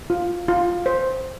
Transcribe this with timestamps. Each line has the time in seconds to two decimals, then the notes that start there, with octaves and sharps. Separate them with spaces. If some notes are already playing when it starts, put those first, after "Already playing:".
0.10 F4
0.48 F4
0.86 C5